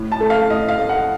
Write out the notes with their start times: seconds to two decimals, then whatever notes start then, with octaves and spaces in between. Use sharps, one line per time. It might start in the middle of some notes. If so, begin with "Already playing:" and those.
Already playing: A2
0.12 A5
0.21 A3
0.30 F5
0.50 A2 D#5
0.69 F5
0.78 A3
0.89 F#5